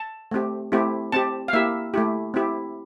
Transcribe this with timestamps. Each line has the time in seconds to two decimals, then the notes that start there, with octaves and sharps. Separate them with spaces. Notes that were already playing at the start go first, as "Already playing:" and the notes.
Already playing: A5
0.31 A3 C4 G4
0.72 A3 C4 E4 G4
1.12 C4 G4 A5
1.48 F5
1.53 A#3 E4 G4 E5
1.94 A3 E4 G4
2.34 C4 E4 G4